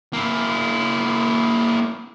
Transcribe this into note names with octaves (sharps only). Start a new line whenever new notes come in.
A#3 E4